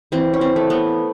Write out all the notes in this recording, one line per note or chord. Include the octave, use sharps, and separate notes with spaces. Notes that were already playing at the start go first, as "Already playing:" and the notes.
E3 C4
C#4
C4
A3
B3